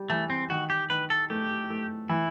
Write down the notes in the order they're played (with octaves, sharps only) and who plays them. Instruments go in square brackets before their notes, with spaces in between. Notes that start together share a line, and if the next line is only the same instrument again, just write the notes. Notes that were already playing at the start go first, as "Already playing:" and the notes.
Already playing: [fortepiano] G3
[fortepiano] E3 [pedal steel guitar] A3
[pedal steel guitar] C4
[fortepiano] D#3 [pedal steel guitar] F#4
[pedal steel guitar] G4
[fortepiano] D#3 [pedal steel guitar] B4
[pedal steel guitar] A4
[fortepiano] A3 [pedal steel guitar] G4
[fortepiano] A3
[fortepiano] E3 [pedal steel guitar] E4